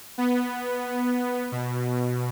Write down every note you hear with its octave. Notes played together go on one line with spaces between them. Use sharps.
B3
B2